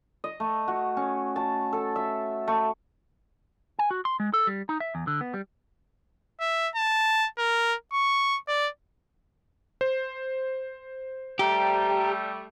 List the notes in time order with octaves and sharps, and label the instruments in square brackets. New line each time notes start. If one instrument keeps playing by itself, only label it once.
[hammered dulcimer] D#5
A3
F#4
C#4
A5
A4
E5
A3
[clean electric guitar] G#5
F#4
C6
G#3
A4
G3
D#4
E5
E2
D3
B3
G3
[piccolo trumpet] E5
A5
A#4
C#6
D5
[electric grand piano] C5
[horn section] G3 A3 [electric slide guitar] G4 [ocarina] A#5